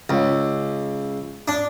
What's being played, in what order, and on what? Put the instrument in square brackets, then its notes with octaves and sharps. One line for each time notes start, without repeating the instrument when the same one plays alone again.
[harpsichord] C#2
D4